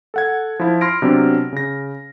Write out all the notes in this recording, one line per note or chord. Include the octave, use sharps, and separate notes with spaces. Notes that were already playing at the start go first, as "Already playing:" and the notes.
A4 F#5 G#6
F3 E4
B5 C6 F6 A#6 D7
C3 F#3 B3 D4
C#3 A#6